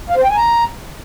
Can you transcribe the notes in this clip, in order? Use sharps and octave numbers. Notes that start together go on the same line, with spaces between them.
F5
C5
G5
G#5
A#5